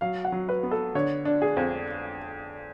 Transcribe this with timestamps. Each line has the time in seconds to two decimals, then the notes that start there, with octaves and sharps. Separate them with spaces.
0.01 F#3 F5
0.25 F#5
0.32 F#3
0.49 B4
0.63 B3
0.71 A4
0.95 D3 C#5
1.25 D4
1.42 G#4
1.57 F2